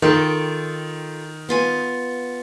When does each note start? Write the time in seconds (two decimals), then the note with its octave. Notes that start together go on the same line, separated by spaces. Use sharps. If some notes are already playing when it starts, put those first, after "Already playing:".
0.02 D#3 F4 A4 G5
1.49 B3 F4 G#5